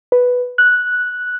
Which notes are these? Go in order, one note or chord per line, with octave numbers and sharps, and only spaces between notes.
B4
F#6